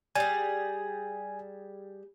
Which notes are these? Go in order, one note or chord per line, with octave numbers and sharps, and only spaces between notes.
G3 G#4 G#5